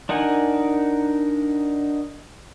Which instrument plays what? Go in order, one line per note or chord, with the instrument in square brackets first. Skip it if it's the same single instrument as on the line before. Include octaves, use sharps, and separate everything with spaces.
[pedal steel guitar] D4 D#4 A#4 F#5 G#5